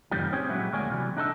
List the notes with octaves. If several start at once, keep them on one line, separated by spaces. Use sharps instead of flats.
F#2 A2 C3 D#3 F3 G3
C4 C#4 G4 G#4 C5 C#5
A#2 F#3 G#3 B3 E4 G4
D2 G#3 A#3 C#5 D5 G#5
C3 E3 F#3 G3
D4 D#4 A4 C5 E5